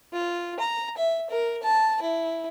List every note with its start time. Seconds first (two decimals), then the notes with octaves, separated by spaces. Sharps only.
0.13 F4
0.60 A#5
0.97 E5
1.30 A#4
1.63 A5
2.02 E4